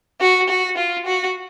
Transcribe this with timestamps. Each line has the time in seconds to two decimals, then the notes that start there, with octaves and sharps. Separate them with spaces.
0.21 F#4
0.49 F#4
0.77 F4
1.06 F#4